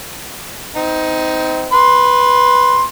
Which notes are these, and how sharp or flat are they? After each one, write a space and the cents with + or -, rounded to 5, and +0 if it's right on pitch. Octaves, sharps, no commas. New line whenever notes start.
C4 -25 D#4 +15
B4 +0 C6 +15